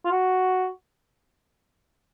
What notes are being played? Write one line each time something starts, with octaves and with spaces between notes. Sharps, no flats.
F4
F#4